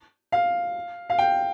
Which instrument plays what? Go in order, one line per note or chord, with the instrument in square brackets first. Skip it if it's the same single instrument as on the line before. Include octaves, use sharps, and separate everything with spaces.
[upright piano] F5
F5
G5